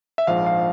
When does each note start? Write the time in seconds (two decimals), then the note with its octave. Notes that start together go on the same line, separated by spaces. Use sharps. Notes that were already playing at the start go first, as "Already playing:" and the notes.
0.18 E5
0.27 A#1 G#2 F3 F5
0.46 F5